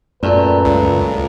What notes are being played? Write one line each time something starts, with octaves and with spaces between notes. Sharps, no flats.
F#2 A#2 A3 B4 G5
C#2